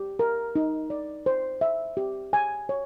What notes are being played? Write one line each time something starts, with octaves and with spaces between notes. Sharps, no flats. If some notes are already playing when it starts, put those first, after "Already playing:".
Already playing: G4
A#4
D#4
D5
C5
E5
G4
G#5
C#5